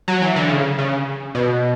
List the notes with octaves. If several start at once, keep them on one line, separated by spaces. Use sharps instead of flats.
F#3
E3
D3
C#3
C#3
B2